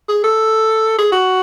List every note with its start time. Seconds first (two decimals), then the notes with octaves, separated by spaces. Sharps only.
0.09 G#4
0.24 A4
0.98 G#4
1.12 F#4